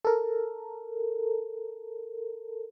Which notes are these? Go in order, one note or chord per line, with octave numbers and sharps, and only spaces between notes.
A4 A#4